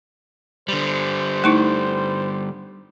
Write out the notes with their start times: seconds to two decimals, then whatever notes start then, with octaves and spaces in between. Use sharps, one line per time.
0.68 D3 G3 C5
1.44 A3 D#4 E4